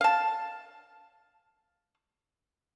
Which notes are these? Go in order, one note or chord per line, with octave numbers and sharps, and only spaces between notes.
F5 A5